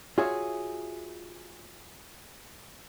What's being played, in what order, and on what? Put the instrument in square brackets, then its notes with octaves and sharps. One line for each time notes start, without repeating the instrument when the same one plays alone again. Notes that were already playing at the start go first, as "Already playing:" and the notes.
[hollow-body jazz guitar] F4 F#4 G#4 C#5 E5